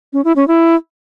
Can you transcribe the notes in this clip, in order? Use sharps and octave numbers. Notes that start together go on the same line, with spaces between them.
C#4
E4
C#4
E4